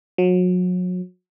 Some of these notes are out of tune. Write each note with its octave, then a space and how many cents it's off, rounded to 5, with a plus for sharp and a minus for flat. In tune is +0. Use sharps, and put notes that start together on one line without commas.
F#3 -35